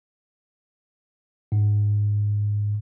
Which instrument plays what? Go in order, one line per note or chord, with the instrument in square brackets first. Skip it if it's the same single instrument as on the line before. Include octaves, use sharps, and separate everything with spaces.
[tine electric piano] G#2